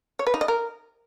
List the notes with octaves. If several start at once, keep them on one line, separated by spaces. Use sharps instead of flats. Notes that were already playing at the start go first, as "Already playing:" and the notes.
C#5
B4
D#4
D#5
A#4